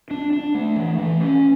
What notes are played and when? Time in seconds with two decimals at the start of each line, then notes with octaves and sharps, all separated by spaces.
0.11 D4
0.33 D4
0.55 A3
0.76 E3
0.98 E3
1.20 C#4